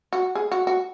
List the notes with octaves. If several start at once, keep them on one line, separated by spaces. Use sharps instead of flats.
F#4
G#4
F#4
F#4